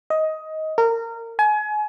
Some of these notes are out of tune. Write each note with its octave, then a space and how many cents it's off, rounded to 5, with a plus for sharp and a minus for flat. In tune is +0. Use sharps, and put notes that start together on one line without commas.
D#5 +15
A#4 -25
G#5 +30